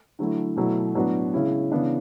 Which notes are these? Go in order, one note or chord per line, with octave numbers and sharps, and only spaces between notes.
D3 F#3 A3 E4
B2 F#3 A3 E4
A2 F#3 B3 D4 F#4
C#3 G#3 C#4 E4
C#3 E3 B3 D4